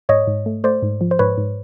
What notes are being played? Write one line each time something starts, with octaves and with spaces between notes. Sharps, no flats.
G#2 C#5 D#5
G#2
A3
A3 C5 D5
G#2
F3
C5
G#2 B4 C#5
G#2